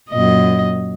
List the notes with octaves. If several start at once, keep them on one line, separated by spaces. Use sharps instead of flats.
F#2 A#2 D#5